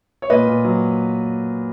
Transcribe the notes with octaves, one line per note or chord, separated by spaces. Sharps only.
C#5
A#2 B4 D#5
A#2
F#3